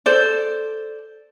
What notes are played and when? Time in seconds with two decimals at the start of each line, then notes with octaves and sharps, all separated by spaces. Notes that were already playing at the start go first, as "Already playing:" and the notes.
0.06 A4 C5 D5